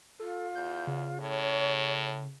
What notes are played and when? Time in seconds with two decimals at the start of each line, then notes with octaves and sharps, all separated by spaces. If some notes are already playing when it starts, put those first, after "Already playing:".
0.20 F4 A4
0.55 E2 G6
0.87 C#3
1.21 A2 C#5